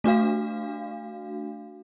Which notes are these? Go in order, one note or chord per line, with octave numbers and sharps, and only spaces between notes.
A3 D4 F#4 F5